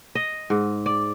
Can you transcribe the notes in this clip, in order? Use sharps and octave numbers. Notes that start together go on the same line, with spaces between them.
D#5
G#2
D5